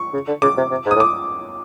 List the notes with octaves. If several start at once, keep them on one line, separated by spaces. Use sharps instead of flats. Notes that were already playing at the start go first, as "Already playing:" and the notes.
Already playing: C#6
C#3
D3
C#3 D6
C3
C3
G#2
D#6
A2
D6